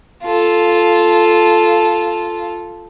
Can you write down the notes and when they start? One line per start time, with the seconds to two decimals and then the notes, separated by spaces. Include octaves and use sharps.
0.24 F4 A4